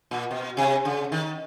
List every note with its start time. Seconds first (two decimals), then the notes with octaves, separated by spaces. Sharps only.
0.11 A#2
0.31 B2
0.57 C3
0.85 C#3
1.12 D#3